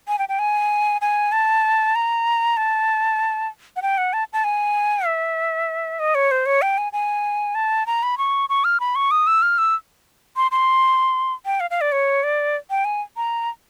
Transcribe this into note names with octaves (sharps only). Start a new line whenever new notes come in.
G#5
G5
G5
G#5
G#5
A5
A#5
A5
F#5
G5
F#5
A5
A5
G#5
E5
D#5
C#5
C5
C#5
G5
G#5
G#5
A5
A#5
B5
C#6
C#6
F6
B5
C#6
D#6
E6
F6
E6
C6
C6
G5
F5
F5
D5
C#5
D5
G5
G#5
A#5